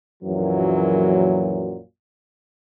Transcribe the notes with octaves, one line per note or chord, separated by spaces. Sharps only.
A#1 F#2 A#2 E3 F#3